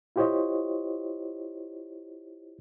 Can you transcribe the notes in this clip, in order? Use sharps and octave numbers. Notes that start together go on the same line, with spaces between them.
E4 F4 G4 C5 C#5 D#5